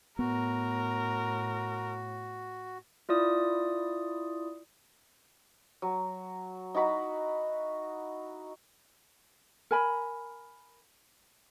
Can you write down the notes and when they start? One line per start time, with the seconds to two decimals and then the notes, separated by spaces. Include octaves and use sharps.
0.19 A2 B3 F#4 A#4
3.09 E4 F4 D5 D#6
5.82 F#3
6.74 D#4 E4 F#4 B5
9.71 A#4 G#5 B5